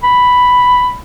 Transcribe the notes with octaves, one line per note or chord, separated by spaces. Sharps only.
B5